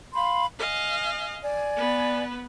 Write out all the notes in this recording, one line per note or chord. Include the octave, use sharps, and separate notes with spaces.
F5 B5 C6
D#5 F5 G#5
D5 G#5
B3 B4